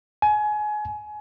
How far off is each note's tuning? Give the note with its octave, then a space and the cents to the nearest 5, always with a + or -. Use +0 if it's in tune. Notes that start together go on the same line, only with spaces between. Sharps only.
G#5 +25